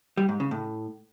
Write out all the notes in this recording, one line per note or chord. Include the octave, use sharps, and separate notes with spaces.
G3
G#2
C#3
A2